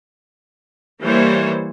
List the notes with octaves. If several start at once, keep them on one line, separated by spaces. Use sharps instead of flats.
E3 G3 A#3 C5 C#5